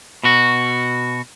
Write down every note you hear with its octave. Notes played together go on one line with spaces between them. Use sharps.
B2 F#4